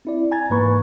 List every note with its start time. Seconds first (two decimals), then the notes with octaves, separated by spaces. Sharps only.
0.05 C4 E4 D5
0.32 G#5 A#5 G#6 A6
0.50 G#2 E3 A#3 B4 B5 C#6